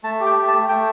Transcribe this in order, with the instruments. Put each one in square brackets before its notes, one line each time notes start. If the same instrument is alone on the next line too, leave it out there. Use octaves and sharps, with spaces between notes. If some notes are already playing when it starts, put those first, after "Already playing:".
[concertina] A3 A5
G4
G5
A3
A5
A3
A3 G5